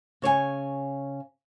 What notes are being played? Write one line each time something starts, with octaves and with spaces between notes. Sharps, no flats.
C#3 C#5 D5 G#5